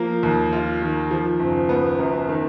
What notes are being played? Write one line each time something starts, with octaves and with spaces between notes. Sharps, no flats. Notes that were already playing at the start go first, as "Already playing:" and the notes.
Already playing: F3 A#3
D#2
F4
D#3
F3
F#1
B3
F#2
D#3